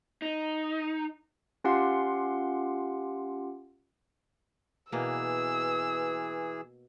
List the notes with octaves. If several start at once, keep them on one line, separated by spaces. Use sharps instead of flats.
D#4
C#4 F4 G4 F5 F#5 C6
B2 E3 A#3 G#4 B4 E6